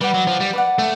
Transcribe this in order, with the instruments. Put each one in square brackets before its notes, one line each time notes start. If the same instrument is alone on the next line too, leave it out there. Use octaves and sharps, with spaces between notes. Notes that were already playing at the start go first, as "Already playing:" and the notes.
[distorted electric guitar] G3 [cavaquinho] B4 D5 F#5
[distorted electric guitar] F#3
F3
G3
[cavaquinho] B4 D5 F#5
[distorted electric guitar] A3